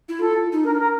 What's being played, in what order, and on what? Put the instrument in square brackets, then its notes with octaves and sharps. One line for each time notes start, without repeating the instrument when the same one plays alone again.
[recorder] E4
[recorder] F4 [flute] A4
[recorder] D#4
[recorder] D4 [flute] A#4
[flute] A#4